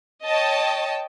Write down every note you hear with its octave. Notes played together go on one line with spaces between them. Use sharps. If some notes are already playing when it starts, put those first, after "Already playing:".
C#5 D#5 G5 A5